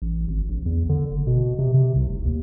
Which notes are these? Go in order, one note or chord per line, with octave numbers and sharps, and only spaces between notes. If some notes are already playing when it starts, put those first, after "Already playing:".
A1
G#1
A#1
E2
D3
F#1
B2
C3
C3
C2
F1
D#2